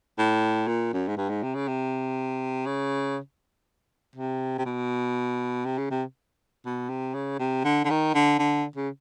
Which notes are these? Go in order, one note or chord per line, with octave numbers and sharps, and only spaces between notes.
A2
A#2
F#2
G#2
G2
G#2
C3
C#3
C3
C#3
C3
C3
B2
C3
C#3
C3
B2
C3
C#3
C3
D3
D3
D#3
D3
D3
C#3